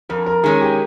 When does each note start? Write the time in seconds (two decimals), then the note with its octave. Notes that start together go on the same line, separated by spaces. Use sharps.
0.09 F2 A#4
0.26 A#4
0.43 D#3 G#3 C#4 G#4
0.61 G4